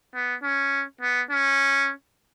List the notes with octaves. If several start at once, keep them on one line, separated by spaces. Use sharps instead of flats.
B3
C#4
B3
C#4